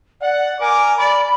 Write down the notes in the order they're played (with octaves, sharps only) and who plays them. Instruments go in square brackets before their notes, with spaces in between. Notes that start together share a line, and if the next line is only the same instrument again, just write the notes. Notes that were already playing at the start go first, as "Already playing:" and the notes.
[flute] D5 [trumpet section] F#5
[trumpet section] A#4 D6 [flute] G#5
[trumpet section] D5 [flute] B5